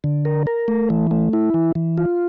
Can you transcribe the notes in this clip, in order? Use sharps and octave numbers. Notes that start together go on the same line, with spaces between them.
D3
A#4
A#4
A3
E3
A3
E4
E3
E3
F4